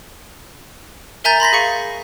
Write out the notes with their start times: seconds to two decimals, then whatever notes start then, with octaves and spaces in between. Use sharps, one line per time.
1.24 A#4 E5 G#5 A#5 G6 A6
1.40 B5 C6 A#6 B6
1.53 G#4 F5 C#6 C#7